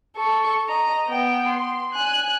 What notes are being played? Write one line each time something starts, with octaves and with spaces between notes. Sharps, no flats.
A4 C#6
D#5 A#5
B3 G5
C6
G#5 F#6